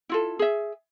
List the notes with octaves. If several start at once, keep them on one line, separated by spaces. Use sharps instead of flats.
E4 F4 A4
G#4 E5